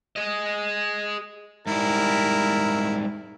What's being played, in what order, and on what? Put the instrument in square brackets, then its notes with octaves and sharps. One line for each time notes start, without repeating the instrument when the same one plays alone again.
[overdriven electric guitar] G#4 D#5
[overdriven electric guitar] G#2 G3 [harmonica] E4 A#4